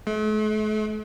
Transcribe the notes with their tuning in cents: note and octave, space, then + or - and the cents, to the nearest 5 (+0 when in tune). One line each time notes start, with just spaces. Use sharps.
A3 -45